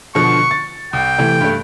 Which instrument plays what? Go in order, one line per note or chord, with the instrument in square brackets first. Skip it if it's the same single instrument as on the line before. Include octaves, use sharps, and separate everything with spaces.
[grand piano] B2 D3 F3 [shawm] C#6
[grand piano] A6
[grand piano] C2 [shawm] G5
[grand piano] C3 E3 A3
G2 A3